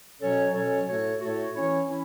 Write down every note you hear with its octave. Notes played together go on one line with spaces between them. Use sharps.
B2 F#3 C#4 A4 C#5
B2 F#3 C#4 A4 C#5
A2 A3 F#4 A4 C#5
A2 A3 F#4 A4 C#5
E3 C#4 E4 C#5
E3 C#4 E4